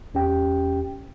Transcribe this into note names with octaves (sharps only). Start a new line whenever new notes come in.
E2 C#4 G4 G5